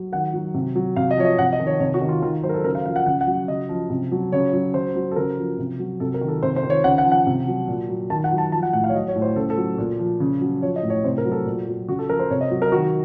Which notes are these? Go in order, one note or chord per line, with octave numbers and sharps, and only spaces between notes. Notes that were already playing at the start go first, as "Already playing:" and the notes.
Already playing: F#3
D#3 F#5
F#3
C3
F#3
C3 F5
D#5
F3 C#5
D#5
C3 F#5
D#5
D#3
C#5
C3 C#5
F#4
D#3
F4
D#3 F4
F#3 C5
A#4
A4
C#3 A#4
F5
F3 F5
F#5
C#3 F#5
F#5
F#3
C#3 D#5
F3
C3
F#3
C#3 C#5
F#3
C#3 C5
F#3
A4
C#3 A#4
F3
C3
F#3
C3 A4
A#4
D#3
A4
C3 C5
C5
D#3
C#5
C#3 F#5
F#5
F3
F#5
C3
F#3
A#2
F#3
D#3 A5
F#5
F#3
A5
F3 A5
F#5
A2 F#5
F5
C#5
F#3 D#5
C#5
A2
C5
C#3 A4
A4
F#3
A#2
F3
C#3
F#3
F3 C#5
D#5
A2
C#5
C3 C5
A#4
F#3
A4
A#2
F#3
C#3 F#4
A4
F3 A#4
C5
C3 C#5
D#5
F#3
A#4
D#3 F#4